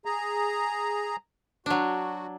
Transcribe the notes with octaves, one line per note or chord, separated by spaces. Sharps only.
G#4 A#5
F#3 D4 F#4